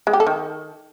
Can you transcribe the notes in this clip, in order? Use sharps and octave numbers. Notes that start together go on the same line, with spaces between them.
G#3
G4
A4
D#3